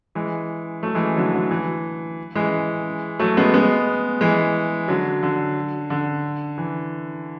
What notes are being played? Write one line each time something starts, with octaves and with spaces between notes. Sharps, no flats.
E3 G#3
F#3 A3
E3 G#3
D3 F#3
D3 F#3
E3
E3 G#3
F#3 A3
G#3 B3
G#3 B3
E3 G#3
D3 F#3
D3
D3
E3